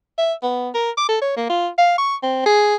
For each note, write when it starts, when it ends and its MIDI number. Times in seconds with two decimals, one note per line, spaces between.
0.18 0.33 76
0.43 0.69 59
0.74 0.90 70
0.97 1.06 86
1.08 1.18 69
1.21 1.35 73
1.36 1.46 58
1.49 1.68 65
1.78 1.95 77
1.98 2.16 85
2.22 2.46 60
2.46 2.75 68